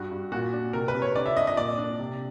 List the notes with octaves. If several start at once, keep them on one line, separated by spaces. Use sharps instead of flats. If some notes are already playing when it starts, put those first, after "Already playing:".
Already playing: G2 F#4
G2
A#2 F#4
D4
C3 A#4
B4
C3
C#5
D3 D5
E5
D4 D#5
D#5
A#2 D5
D4
C3